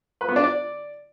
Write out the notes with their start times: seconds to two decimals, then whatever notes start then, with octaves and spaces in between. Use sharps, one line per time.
0.21 B4
0.28 B3
0.36 D4
0.44 D5